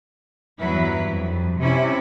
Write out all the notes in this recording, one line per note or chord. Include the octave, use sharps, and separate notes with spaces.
E2 G2 F#3 E4 B4
F2
C3 C#4 E4